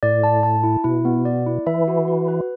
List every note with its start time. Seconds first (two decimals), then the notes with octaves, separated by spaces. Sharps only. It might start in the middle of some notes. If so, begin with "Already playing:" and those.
0.03 A2 D5
0.24 A5
0.43 A5
0.63 E4
0.84 B2 E4
1.05 B3
1.25 D5
1.47 E4
1.67 E3 E5
1.88 F#4
2.08 F#4
2.28 B4